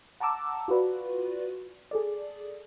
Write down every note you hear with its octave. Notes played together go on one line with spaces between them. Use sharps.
F#5 A5 A#5 D6 E6
F4 F#4 B4 D5
G#4 A4 D5